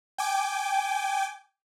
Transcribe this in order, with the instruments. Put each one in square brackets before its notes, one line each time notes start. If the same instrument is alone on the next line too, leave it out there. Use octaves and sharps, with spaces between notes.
[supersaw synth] G5 G#5 D6